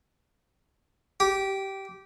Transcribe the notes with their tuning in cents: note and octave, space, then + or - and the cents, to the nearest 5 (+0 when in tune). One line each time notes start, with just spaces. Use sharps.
G4 -15